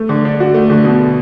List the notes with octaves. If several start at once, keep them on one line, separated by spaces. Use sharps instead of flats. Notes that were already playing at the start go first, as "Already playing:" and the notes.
Already playing: A3
D3
D4
F#4
A3
D3
B2